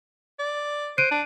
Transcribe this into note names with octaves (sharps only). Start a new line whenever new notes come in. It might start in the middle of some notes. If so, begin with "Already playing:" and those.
D5
C5 F#6 D7 D#7
D4